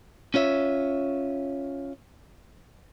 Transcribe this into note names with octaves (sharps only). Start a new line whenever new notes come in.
C#4 F4 C#5 E5